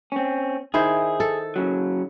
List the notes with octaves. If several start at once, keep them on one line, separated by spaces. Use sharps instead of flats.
C4 C#4
D#3 E4 G#4 C5
A4
C#3 F#3